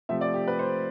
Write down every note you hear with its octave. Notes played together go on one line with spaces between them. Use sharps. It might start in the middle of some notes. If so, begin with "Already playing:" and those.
C3 F3 A3 C4 E5
D5
G4
B4
C5